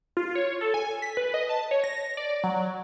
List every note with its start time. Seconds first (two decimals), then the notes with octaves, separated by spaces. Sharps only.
0.17 F4
0.35 C#5
0.61 A4
0.74 G#5
1.02 B6
1.17 B4
1.34 D#5
1.49 A5
1.71 C#5
1.84 A#6
2.17 D5
2.44 F#3